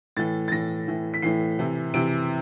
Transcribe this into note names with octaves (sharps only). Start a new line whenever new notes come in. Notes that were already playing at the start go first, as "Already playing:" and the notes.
A2 E3 A6
A6
A2 E3 A#6
A2 E3
B6
A2 E3 C7
C3 E3
C3 E3 D7